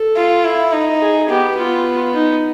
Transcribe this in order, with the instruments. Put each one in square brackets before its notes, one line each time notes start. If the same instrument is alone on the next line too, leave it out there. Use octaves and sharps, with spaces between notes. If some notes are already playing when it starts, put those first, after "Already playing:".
Already playing: [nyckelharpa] A4
[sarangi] F4
E4
D#4
[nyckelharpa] G#4
[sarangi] B3 [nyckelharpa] G4
[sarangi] B3 [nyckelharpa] F4
[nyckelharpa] D#4